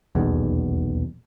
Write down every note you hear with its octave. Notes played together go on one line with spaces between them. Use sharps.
D#1 B1 E2